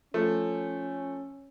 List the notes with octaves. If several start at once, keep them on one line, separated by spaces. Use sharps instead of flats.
F3 A3 C#4